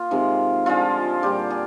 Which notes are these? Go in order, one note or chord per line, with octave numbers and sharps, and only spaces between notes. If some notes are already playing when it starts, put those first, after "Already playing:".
Already playing: A#3 F4
C3 D#3 G#3
D3 F3 G#3 F4
A#2 G3 A#3 G4
G#4